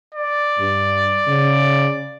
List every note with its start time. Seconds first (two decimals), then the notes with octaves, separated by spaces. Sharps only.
0.15 D5
0.58 G2
1.28 C#3